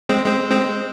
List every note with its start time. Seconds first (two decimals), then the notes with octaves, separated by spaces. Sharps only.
0.09 G#3 C4
0.26 G#3 C4
0.51 G#3 C4